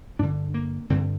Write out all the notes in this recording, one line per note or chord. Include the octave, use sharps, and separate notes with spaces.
G2 D3 D4
A#3
G2 D3 C4